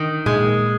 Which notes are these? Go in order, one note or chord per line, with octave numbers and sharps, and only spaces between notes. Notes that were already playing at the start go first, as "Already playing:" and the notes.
Already playing: D#3
A#2 G#3